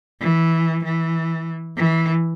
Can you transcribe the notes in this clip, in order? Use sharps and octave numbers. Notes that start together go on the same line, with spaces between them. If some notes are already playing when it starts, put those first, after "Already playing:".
E3
E3
E3